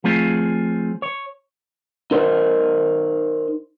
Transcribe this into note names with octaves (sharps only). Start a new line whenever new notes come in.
F3 A3 C4 F4 G#4 C#5
C#5
D#4 A#4 C5 D5 D#5